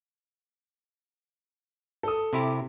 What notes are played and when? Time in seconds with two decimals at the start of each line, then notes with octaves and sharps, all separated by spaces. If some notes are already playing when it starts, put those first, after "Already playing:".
2.03 A4 D#6
2.33 C3 E4 G4